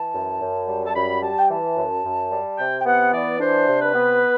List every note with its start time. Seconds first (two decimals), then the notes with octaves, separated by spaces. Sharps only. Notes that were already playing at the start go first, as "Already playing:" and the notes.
Already playing: E3 A5
0.13 F#2
0.41 F#2
0.68 G3
0.86 A5
0.95 F#2 B5
1.22 G3 A5
1.38 G5
1.50 E3 A5
1.77 F#2
2.05 F#2
2.31 G3
2.58 C3 G5
2.80 G5
2.86 B3 F#5
3.13 E3 D5
3.40 D4 C5
3.67 C3
3.81 B4
3.95 B3